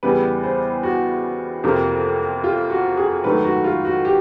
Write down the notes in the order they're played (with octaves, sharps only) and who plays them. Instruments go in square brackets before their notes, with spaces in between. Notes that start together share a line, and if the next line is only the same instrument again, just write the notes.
[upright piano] E2 C#3 E3 G3 B3 B4
C5
F#4
F2 C3 F3 A#3
F4
F#4
G#4
G#2 D#3 F#3 A3 B4
F#4
F4
F#4
G4